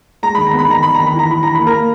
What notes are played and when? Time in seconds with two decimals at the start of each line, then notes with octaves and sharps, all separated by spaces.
0.23 G#3 A#5
0.35 D#3 B5
0.47 A#5
0.53 B3
0.59 B5
0.68 D#3 A#5
0.83 D#3 B5
0.95 D#3 A#5
1.07 B5
1.14 E3
1.19 A#5
1.28 E3 B5
1.43 E3 A#5
1.55 A#3 B5
1.66 A#4 A#5
1.74 A#3